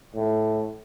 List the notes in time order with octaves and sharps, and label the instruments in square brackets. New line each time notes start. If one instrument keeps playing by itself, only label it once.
[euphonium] A2